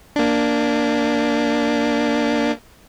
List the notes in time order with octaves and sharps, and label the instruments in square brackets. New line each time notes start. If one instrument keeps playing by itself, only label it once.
[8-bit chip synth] A#3 D4